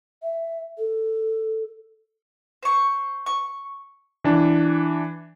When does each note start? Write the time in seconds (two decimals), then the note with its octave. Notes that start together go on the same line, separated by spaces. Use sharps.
0.22 E5
0.78 A4
2.63 C5 C#6
3.26 C#6
4.24 E3 D4